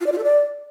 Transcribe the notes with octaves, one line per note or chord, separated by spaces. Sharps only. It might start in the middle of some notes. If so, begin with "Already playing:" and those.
F4
D5
F4
A4
D5